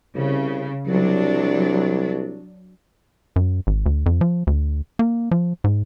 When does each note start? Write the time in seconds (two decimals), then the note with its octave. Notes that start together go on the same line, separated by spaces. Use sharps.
0.15 C2 C#3
0.88 C2 F#3 D4
3.36 F#2
3.67 G#1
3.86 D2
4.06 F2
4.21 F3
4.47 D2
4.99 A#3
5.31 F3
5.64 G#2